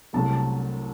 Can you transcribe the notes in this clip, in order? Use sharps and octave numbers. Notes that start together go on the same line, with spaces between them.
C2 C3 F#3 A3 A5
A5